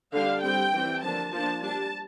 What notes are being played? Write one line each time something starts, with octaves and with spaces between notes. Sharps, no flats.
D3 G3 D4 F5
G3 C4 G5
E3 G3 C4
D3 F3 A#3 D4 A5
F3 A#3 D4 A5
G3 D4 A5